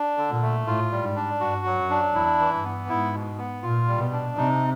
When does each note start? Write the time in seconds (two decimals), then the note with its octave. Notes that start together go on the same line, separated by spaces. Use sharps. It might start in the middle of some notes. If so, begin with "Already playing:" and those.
Already playing: D4
0.18 D3
0.30 A#2
0.42 A3
0.67 A2 F4
0.92 G3
1.04 G#2
1.16 D4
1.40 G2 F#4
1.66 F#3
1.78 F#2
1.90 D4
2.15 E2 E4
2.40 E3
2.52 G2
2.65 B3
2.89 G#2 E4
3.13 B2
3.38 B3
3.63 A#2 F4
3.88 G3
4.00 B2
4.12 D4
4.37 C3 D#4